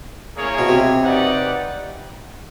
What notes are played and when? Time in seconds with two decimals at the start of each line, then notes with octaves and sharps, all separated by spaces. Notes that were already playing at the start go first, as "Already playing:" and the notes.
0.36 A#3 C#4 E4 G#4 C#5
0.59 B2
0.68 C3
1.02 D#4 G4 B4 D5 F#5